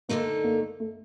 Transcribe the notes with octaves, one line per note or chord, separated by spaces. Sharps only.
D2 D3 A3 A#3 D#4
A#3
A3